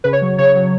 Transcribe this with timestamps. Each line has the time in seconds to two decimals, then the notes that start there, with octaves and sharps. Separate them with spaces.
0.04 C#3 B4
0.13 C#5
0.22 F#3
0.38 C#3 C#5
0.55 F#3